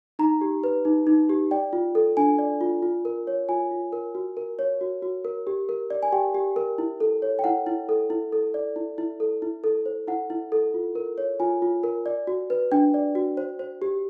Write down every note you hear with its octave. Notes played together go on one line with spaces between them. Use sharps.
D#4 A#5
G4
B4
D#4
D#4
G4
D5 G5
F4
A4
D4 G#5
D5
F4
F4
A#4
C#5
F4 G#5
F4
A#4
F#4
A#4
C#5
F#4
F#4
A#4
G4
A#4
D5
G#5
G4 G5
G4
A#4
E4
A4
C#5
G5
E4 F#5
E4
A4
E4
A4
D5
E4
E4
A4
E4
A4
C5
E4 F#5
E4
A4
F4
A#4
C#5
F4 G#5
F4
A#4
D5
F#4
B4
D4 G5
D5
F#4
C5
C5
G4